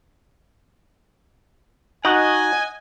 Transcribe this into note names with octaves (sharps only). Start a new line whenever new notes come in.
D#4 F#4 D#5 F#5 G#5